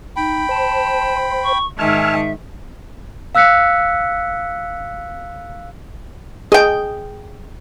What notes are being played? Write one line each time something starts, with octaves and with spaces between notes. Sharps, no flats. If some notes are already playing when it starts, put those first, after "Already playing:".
D#4 G5 B5
C5 A5
C#6
G#2 D#3 E5 G#5 A5 E6 F6
F5 E6 F#6 B6 C#7
G#4 D#5 G5